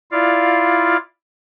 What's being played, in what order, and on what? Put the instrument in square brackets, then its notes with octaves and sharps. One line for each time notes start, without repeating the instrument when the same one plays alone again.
[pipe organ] E4 F4 D5 F5